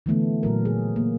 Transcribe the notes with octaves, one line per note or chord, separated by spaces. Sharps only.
D3 E3 A3 B3
A#2 F#3 A#4
G#4
A#3